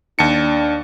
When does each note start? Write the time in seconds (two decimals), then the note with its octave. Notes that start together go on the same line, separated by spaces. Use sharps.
0.19 D#2 D4 A5 C#7